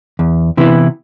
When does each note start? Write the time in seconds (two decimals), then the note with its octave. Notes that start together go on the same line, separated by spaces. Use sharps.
0.19 E2
0.57 C3 E3 B3 E4